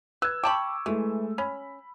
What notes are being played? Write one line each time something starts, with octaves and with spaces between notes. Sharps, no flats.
B4 E6 G#6
G5 A5 B5 C#6 D6
E3 G#3 A3
C#4 B5